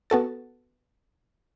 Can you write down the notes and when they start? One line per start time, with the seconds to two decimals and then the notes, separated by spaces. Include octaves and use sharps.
0.10 B3 F#4 A4 A6